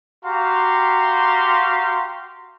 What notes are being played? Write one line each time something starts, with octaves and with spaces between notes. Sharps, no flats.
F#4 G4 F5 A#5 C6